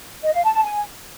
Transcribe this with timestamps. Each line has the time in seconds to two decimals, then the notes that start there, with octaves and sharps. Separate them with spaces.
0.23 D#5
0.33 F5
0.43 A5
0.54 A5
0.64 G#5